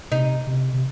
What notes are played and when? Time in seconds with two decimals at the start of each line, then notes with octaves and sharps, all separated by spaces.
0.12 C3 D#4
0.47 C3
0.74 C3